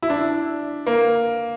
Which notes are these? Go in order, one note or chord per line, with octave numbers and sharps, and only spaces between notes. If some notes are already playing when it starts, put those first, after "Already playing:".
E4
D4
A#3